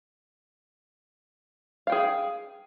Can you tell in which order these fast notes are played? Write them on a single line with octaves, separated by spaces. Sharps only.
F5 G5 G#4